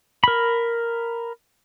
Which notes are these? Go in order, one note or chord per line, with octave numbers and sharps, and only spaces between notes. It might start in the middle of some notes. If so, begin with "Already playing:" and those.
A#4 B5